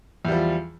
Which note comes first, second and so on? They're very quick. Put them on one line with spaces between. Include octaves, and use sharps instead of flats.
E2 G3 F3